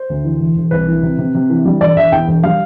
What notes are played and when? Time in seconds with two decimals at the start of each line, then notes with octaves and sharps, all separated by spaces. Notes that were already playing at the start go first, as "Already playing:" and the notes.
Already playing: C5
0.10 D2
0.25 E3
0.40 E1
0.56 E1
0.71 C2 B4
0.88 E3
1.03 C3
1.18 C3
1.34 C3
1.50 E3
1.65 G3
1.81 E1 D5
1.96 E1 E5
2.12 E2 G5
2.27 E1
2.43 G3 F5